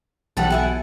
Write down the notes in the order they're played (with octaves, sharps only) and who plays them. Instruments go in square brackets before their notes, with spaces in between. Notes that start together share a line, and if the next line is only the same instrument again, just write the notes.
[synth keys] B1 E3 F#5 [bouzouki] G3 A4
[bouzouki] B3 E4 G#5